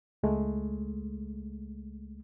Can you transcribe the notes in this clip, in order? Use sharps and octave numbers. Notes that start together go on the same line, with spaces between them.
C#2 G#3 A3